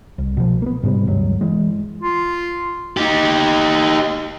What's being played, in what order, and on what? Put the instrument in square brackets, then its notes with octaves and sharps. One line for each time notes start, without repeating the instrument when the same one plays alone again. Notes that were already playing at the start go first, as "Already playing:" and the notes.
[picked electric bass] C2
B2 F3
A#3 B3
G#2 C3 G3 C4
D2 G2 F#3 G#3
E3 G#3
[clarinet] F4
[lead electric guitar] D#4 G4